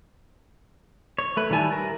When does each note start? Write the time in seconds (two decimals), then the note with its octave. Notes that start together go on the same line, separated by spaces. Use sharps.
1.18 C#5
1.37 A3 B4
1.50 D#3 G3 E4 G#5 A5
1.72 A#4